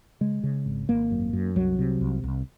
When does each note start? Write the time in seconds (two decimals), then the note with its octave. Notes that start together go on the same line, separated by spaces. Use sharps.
0.21 C#3 G#3
0.43 C#3
0.66 G#1
0.89 G#1 A#3
1.11 F#2
1.33 F#2
1.55 C2 F#3
1.79 C3
2.01 C2
2.24 C2